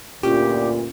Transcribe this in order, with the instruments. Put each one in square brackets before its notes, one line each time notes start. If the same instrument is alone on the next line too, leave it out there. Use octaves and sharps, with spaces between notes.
[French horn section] D2 G2 A#2 [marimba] C#4 F4 [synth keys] G4